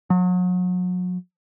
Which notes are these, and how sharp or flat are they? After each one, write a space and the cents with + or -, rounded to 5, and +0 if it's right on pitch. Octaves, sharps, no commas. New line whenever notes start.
F#3 -35